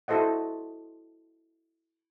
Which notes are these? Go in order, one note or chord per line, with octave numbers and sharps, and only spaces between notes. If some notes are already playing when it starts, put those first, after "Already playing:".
E4 F#4 A4 C5 D#5 F#5